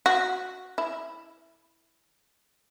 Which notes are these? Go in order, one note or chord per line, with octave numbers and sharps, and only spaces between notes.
F#4
E4